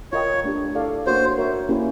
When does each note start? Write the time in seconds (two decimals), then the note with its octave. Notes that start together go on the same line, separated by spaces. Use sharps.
0.12 F4 A#4 C#5 D#5 G5
0.44 A3 D4 G4
0.75 E4 A4 D5 F5
1.07 A#3 D4 F#4 A#4 C5 C#5
1.38 F#4 A#4 C#5 E5
1.69 A#3 C#4 E4 G4